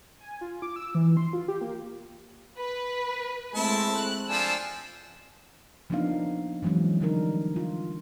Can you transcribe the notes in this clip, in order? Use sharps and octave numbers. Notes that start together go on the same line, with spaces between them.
G#5
F4
D6
E6
E3
C6
F4
G4
A#3
B4
G#3 A3 C4 E4 A5
F#6
F3 D4 G5 G#5 E6
F3 A#3 B3 D4 D#4 F5
E3 F#3 G#3 C4 C#4
D3 F3 G3 D4 D#4 A#4
F4